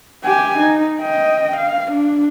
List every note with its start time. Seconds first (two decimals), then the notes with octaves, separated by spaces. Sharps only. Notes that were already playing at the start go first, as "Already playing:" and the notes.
0.24 G4 G#5
0.59 D#4
1.00 D#5 G5
1.57 F5
1.92 D4